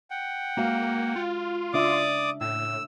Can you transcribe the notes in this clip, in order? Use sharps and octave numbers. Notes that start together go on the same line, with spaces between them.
F#5 G5
G#3 A#3 F#4 F5
F4
C#3 D4 D5 E5 D6 D#6
A2 E6